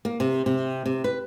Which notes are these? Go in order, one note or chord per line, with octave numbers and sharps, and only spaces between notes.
A#3
C3
C3
C3
B4